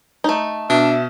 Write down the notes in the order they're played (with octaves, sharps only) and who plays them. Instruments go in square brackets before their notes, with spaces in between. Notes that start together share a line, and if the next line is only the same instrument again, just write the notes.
[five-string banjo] A3 D#4
[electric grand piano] B2 [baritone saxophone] D4 [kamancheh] E5